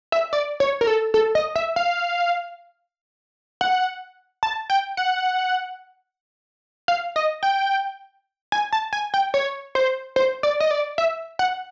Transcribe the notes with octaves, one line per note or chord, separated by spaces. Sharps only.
E5
D5
C#5
A#4
A4
A4
D#5
E5
F5
F#5
A5
G5
F#5
F5
D#5
G5
G#5
A5
G#5
G5
C#5
C5
C5
D5
D#5
D5
E5
F#5